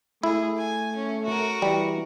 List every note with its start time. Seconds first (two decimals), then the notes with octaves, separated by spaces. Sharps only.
0.23 A3 E4 G#4
0.57 G#5
0.96 C#4
1.26 F#4 A#4
1.62 E3 G3